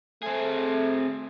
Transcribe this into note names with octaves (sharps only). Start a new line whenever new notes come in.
A3 C4 G#4